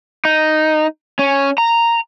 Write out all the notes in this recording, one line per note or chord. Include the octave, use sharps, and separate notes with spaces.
D#4
C#4
A#5